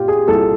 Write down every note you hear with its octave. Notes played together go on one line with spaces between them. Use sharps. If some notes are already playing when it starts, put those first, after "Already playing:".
Already playing: A#2 F4 G4
G#4
C2 A#2 A4